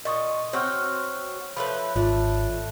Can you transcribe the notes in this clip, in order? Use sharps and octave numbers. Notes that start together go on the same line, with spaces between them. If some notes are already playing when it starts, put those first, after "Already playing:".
A#2 D#5 C#6 D#6
C4 F#4 C#5 G5 C#6 F6
F3 A3 B4 C#5 B5
G#1 A3 D4 F4